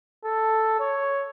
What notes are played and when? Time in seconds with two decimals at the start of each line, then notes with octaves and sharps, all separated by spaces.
0.25 A4
0.80 C#5